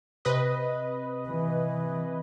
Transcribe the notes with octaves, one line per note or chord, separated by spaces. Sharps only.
C3 B4 D#5
E3